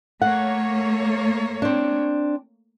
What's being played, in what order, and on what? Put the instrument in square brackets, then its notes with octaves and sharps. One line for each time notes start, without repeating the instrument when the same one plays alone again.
[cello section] A3 A#3 C#5 [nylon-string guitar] F#5
[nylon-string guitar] C4 D4